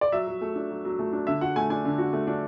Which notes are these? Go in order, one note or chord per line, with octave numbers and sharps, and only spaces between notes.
D5
F#3 E5
F#3
A3
D4
F#3
F#3
A3
D4
D3 E5
F#4 F#5
A3 G#5
D4 G#5
D3
F#4
A3
D4